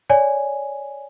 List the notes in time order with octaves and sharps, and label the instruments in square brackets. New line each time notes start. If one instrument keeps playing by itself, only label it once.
[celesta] C#5 D5 G#5